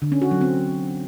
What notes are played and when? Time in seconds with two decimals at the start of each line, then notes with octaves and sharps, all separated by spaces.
0.02 D3
0.12 C#4
0.22 F#4
0.31 F#3
0.41 C4